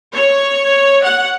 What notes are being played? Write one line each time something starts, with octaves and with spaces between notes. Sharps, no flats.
C#5
F#5